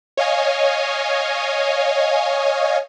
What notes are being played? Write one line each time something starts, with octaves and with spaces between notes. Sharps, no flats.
C#5 D#5 F5 G#5